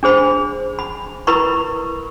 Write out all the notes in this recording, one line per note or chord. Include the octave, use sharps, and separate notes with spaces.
D4 G#4 C5 B5
B5
E4 A#4 B4 A#5 B5 C#6